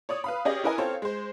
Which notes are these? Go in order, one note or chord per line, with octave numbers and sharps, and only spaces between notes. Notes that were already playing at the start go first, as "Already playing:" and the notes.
C#5 D5 D#6
B4 F5 B5
C#4 G4 G#4 D5 D#5
C#4 E4 A#4 B4 D#5 G#5
C4 F4 A4 C#5
G#3 C5